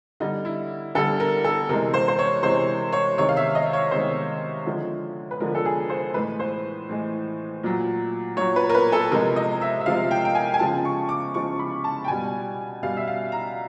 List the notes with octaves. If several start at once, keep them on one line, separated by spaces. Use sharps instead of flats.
D3 G3 D#4
E4
D3 G3 A4
A#4
A4
C3 E3 G#3 A#4
C5
C5
C#5
C3 E3 G#3 C5
C#5
C3 D#3 G#3 C#5
F5
E5
D#5
C#5
C3 D#3 G#3 C5
D3 F3 G#3
B4
D3 F3 G#3 A#4
A4
G#4
C5
A2 E3 G#3 B4
C5
A2 E3 G#3
A#2 F#3
A#2 F#3 C#5
B4
A#4
B4
A4
C3 F3 G#3 A#4
D#5
E5
E5
C3 F3 G#3 F5
G5
G5
G#5
G#5
C#3 F3 G#3 A5
C#6
D6
C#3 F3 G#3 C#6
B5
A5
G5
B2 G3 G#5
B2 G3 F5
E5
F5
A#5